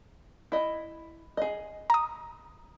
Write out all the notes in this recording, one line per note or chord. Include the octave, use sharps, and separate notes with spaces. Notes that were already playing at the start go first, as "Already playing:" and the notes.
E4 D#5
G#4 D#5
A#5 D#6